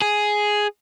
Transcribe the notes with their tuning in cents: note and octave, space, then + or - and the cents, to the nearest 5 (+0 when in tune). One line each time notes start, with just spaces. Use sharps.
G#4 +5